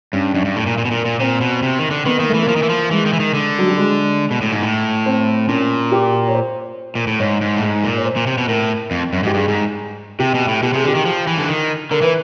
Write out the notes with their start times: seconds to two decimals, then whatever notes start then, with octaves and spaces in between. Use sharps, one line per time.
0.13 G2 C#4
0.34 F#2 D4
0.45 G2
0.56 A2
0.66 A#2
0.78 A#2
0.85 B2
0.91 A#2
1.05 A#2
1.20 A#2 C4
1.41 B2
1.63 C3
1.79 D#3
1.91 D3
2.05 D#3 B3
2.18 D#3 A#3
2.29 E3 A3
2.42 A#3
2.48 F3
2.56 D#3
2.63 E3
2.69 F3
2.91 E3 G#3
3.06 D#3
3.13 E3
3.20 D#3
3.34 D3
3.59 F#3
3.68 G3
3.78 G#3
4.31 B2
4.41 A2
4.52 G#2
4.63 A2
5.06 C4
5.48 A#2 C#4
5.92 G4
6.27 C#5
6.34 C5
6.95 A#2
7.07 A2
7.19 G#2 C#5
7.41 G#2
7.57 A2
7.63 G#2
7.84 A#2
7.97 C#5
8.05 C5
8.16 A#2
8.27 C3
8.38 B2
8.48 A2 A#4
8.91 F2
9.13 F#2
9.23 G#2 G4
9.34 G2 G#4
9.48 G#2
10.19 C3 G4
10.34 B2
10.48 A2
10.62 B2 G4
10.73 C3 G#4
10.84 D3 G4
10.95 D#3
11.05 F3
11.27 E3
11.38 D3
11.49 D#3
11.91 D3 A#4
12.02 E3 B4